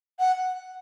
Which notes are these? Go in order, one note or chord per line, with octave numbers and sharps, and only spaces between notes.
F#5